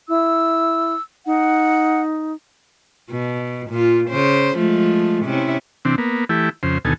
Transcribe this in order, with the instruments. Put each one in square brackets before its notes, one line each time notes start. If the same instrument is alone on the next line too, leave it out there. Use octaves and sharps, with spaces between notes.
[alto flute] E4 [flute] E6
[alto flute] D#4 [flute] F#5
[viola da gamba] B2
A#2 F4
C#3 C5
F3 G#3 A3
C3 C#4 E4
[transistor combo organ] C3 E3 C4 D4
A#3 B3
E3 A3 E4 G4
F2 C#3 C5
D2 B2 D#3 A4 G#5